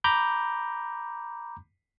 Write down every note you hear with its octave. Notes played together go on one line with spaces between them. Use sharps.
A#5 B5 D6 G6